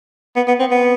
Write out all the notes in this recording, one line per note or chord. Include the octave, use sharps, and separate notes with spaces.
B3
B3
C4
B3